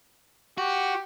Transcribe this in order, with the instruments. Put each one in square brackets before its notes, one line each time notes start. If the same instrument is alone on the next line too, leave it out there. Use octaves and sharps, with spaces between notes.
[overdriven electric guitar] F#4 [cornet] G4